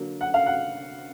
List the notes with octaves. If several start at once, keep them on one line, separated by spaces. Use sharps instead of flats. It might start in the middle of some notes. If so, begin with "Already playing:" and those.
Already playing: D3 F#3 A#3
F#5
F5
F#5